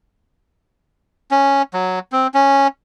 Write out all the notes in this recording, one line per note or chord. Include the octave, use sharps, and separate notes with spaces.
C#4
F#3
C4
C#4